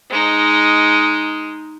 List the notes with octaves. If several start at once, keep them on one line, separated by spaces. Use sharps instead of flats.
G#3 D#4